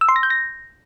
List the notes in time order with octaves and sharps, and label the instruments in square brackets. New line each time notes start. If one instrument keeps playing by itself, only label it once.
[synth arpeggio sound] E6
C6
A#6
G6
A#6